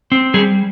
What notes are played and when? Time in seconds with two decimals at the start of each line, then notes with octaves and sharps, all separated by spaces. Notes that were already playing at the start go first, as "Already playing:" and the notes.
0.12 C4
0.34 G3 G#4